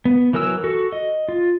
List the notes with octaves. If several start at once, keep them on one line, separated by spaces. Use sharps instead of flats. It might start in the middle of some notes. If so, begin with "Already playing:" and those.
B3
E3 F#3 A#4 G#5 E6
F#4 A4
D#5
F4